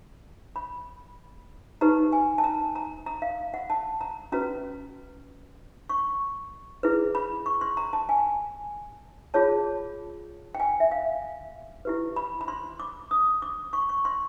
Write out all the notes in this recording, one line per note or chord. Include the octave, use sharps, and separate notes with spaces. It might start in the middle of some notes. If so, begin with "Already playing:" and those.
B5
D#4 G4 B4 A#5
G#5
A5
A#5
A#5
A#5
F5
F#5
A5
A#5
C#4 F#4 B4 A#5
C#6
E4 G#4 B4
B5
C#6
C6
A#5
A5
G#5
F4 G#4 C#5 A5
G5
G#5
E5
F5
E4 G4 B4
B5
B5
C6
D6
D#6
D6
C#6
C#6
C6